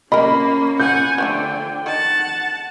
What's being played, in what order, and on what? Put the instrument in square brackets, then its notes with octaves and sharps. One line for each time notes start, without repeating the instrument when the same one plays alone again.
[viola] A#3 [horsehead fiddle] C#4 [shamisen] A#4 D#5 [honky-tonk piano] B5
[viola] F#5 G#5 [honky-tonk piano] G6
[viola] D3 [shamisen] F3 A3 B3 [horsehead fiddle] G5
[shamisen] D#3 [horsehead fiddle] F#5 [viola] A5